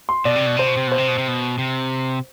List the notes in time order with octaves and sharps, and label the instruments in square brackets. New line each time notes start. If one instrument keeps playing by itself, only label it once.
[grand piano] C6
[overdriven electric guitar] B2 [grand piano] D5
[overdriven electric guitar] C3
B2
[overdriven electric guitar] C3 [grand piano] C5
[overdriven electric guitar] B2
C3
[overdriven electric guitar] B2 [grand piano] C5
[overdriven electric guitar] C3
B2
C3
B2
C3